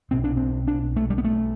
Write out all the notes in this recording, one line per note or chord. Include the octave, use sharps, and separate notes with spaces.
B1 B2 C4
D4
C4
D4
A3
G3
B3
A3